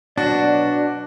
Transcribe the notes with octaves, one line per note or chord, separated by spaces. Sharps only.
B2 F#3 D4 F#4 D5